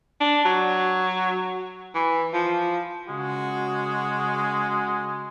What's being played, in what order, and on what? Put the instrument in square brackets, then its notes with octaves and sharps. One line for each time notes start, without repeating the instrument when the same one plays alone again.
[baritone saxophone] D4
F#3
E3
F3
[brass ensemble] C#3 F#4 [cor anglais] G#3